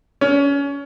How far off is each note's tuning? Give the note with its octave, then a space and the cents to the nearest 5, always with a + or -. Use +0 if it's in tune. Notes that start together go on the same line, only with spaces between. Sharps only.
C#4 +25